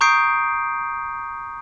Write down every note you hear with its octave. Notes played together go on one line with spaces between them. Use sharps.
A#5 C#6 D#6 G6 C7 D7